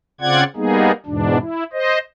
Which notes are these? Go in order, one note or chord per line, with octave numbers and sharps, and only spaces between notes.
C#3 C4 F4 D5 F#5 G#6
G3 A#3 B3 D#4 G#4
E2 G#2 B2 D4
E4
C5 D#5